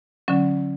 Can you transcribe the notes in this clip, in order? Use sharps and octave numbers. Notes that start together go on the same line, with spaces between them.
D3 F#3 C#4